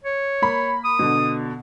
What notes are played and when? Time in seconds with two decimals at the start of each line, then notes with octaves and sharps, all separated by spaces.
0.04 C#5
0.42 A#3 B5
0.85 D#6
0.99 B2 D3